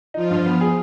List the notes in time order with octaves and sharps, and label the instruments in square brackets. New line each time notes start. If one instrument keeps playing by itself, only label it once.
[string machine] F3 F4 [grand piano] D#4
[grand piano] G2
B3
G#4